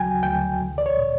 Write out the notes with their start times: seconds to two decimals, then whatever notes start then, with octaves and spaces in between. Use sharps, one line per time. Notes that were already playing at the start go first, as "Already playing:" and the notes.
Already playing: D2 C#3 F#3 G5 G#5
0.23 D2 G5
0.61 C2
0.78 D5
0.86 C#5
0.98 A#2